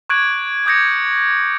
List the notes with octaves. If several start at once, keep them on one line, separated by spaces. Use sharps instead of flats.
C#6 D6 F#6 G#6 D7 F#7
D6 D#6 G6 G#6 A#6 C#7